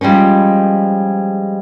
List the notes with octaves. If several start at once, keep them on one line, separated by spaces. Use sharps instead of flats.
F3 G3 G#3 C4 C#4